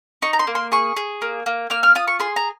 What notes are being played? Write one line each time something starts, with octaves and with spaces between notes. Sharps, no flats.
D#4 C#6
A#5
C6
A#3
C6
G#4 C#6
G#4
A#3
A#3
A#3 F6
F6
F4 D#6
C#6
G#4 C6
A#5